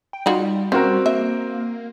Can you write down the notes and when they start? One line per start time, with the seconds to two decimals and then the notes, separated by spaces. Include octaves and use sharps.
0.13 G5
0.26 G3 D#4 F4 F#4
0.72 C4 C#4 F#4 A#4
1.06 A#3 E5